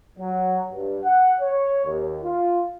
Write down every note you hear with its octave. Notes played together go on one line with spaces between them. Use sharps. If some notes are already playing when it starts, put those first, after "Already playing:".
F#3
G2
F#5
C#5
D#2
F4